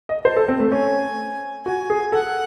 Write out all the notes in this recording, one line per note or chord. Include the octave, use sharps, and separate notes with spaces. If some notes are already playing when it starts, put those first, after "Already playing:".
D#5
C5 A5
A4
C4
A3
C#4 G#5
F#4 G#5
G#4
A4 F#5